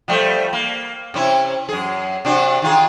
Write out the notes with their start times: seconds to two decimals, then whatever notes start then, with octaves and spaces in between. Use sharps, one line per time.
0.08 F3 G3 A3
0.53 A#3
1.14 C3 C#4 E4
1.69 F#2 G#4
2.25 C3 D4 F#4
2.62 D#3 F4 G#4